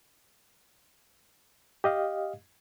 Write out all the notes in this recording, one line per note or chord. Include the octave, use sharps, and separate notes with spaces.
G4 D#5 F5